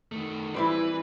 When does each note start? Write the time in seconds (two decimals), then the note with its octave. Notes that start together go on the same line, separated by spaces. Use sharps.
0.12 D#3 A3
0.54 E3 G3 C4 E4 B4